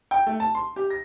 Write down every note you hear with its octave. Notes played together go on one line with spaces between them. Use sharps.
G5
A3
A5
C6
G4
A#6